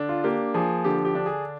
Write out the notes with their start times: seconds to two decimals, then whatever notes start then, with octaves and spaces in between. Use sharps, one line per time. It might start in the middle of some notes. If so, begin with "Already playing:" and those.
Already playing: D3 D4
0.09 F4
0.24 A#3 G4
0.54 F3 G#4
0.84 D3 G4
1.05 G4
1.15 D4
1.26 G#4